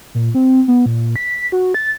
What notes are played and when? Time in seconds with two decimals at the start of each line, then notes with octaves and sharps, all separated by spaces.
0.15 A#2
0.35 C4
0.68 B3
0.86 A#2
1.16 B6
1.52 F#4
1.74 A6